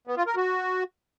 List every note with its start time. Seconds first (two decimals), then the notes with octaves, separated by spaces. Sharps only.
0.07 B3
0.17 F4
0.27 A#4
0.36 F#4